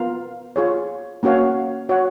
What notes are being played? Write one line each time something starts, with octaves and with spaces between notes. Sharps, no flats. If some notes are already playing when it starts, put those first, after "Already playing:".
Already playing: B3 F4 A#4 F5
F4 G#4 C#5
A#3 C#4 F#4 C#5 F5
F#4 C#5 F#5